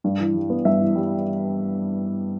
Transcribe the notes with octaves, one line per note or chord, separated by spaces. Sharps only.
G2
E3
G3
B3
G2 E5
E3
G3